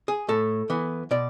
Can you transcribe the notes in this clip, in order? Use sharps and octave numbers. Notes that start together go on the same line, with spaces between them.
G#4
A2 A4
E3 B3
B2 D5